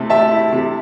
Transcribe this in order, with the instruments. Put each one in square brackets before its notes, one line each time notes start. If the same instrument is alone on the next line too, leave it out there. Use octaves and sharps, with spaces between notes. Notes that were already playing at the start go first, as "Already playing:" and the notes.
Already playing: [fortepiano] C3 A3 E4
[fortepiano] G4 [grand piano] E5 A5
[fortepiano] E4
C3